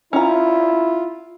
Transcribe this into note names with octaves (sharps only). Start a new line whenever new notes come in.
C#4 E4 F4 A#5